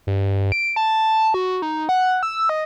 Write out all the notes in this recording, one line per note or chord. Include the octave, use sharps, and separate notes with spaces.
G2
D7
A5
F#4
D#4
F#5
E6
D#5